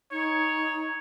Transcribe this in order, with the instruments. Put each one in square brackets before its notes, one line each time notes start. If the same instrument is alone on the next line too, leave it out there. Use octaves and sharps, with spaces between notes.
[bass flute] D#4 [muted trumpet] C#5